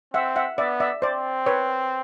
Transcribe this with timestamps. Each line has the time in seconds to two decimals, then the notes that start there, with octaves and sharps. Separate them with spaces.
0.14 C4 E5 F#5
0.36 E5 F#5
0.58 B3 D5 E5
0.80 D5 E5
1.02 C4 C5 D5
1.46 B4 C#5